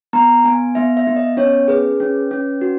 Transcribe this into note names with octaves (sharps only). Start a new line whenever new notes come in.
B3 A#5
B3 G#5
B3 E5
E5
B3
D#5
C#4 C#5
G#4 B4
C#4
C#4
F#4